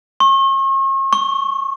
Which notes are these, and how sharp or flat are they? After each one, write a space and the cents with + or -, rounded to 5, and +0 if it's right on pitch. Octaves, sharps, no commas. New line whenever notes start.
C#6 -40
C#6 +5